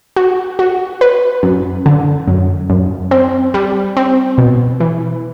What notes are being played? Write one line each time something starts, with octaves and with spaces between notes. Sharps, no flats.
F#4
F#4
B4
F#2
D3
F#2
F#2
C4
G3
C4
B2
E3